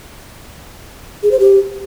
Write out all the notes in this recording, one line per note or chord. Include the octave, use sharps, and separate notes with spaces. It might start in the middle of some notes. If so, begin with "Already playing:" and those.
G#4
C5
G4